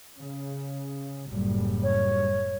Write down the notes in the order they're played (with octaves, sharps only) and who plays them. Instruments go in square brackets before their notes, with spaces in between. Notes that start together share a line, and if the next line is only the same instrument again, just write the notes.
[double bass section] C#3
F#1 A2 G3
[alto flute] C#5